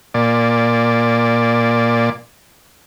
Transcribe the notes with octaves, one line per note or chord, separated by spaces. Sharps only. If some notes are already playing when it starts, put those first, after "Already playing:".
A#2 D5